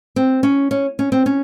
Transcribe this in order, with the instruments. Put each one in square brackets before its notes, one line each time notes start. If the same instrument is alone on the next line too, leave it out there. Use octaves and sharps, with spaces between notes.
[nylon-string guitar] C4
C#4
C#4
C#4
C4
C#4